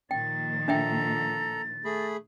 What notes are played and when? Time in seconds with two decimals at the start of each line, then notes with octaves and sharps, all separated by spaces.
0.11 A#2 D#3 F3 G5 A6
0.68 D4 A4 E5 G5 A#5
1.85 A3 G#4 B5